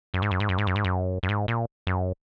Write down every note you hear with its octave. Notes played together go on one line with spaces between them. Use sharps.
F#2
G#2
F#2
G#2
F#2
G#2
F#2
G#2
F#2
F#2
G#2
A#2
F#2